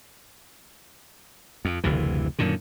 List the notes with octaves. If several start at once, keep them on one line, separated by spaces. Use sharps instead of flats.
F2
F#1 D2 C3 E3
F#2 A#2 D3 D#3